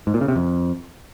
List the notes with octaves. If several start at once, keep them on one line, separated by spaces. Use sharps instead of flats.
G#2
A#2
C#3
C3
F2